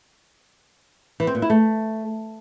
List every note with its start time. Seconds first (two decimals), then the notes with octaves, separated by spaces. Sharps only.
1.20 E3
1.27 C4
1.35 A#2
1.42 E4
1.50 A3